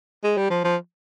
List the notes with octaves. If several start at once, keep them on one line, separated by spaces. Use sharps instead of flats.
G#3
G3
F3
F3